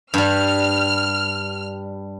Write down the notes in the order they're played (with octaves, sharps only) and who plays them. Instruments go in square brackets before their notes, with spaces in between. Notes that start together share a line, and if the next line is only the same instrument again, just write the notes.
[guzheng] G2 G3 [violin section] F6